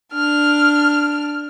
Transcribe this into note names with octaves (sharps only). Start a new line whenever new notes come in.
D4 F6